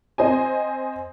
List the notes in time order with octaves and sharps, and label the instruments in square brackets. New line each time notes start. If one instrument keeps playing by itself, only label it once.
[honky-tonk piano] C4 C5 D#5 G#5